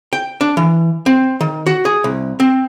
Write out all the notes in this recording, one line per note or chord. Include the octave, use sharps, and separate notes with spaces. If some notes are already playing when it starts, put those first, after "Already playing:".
G5
D4
E3
C4
D#3
F#4
G#4
C2
C4